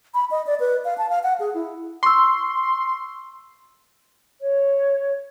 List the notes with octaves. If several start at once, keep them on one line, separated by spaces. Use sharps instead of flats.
B5
D#5
D5
B4
F5
A5
F5
F#5
G#4
E4
C6 C#6 E6
C#5